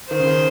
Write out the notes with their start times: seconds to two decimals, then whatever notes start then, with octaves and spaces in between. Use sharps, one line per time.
0.11 D#3 C5
0.19 C#3
0.27 D#3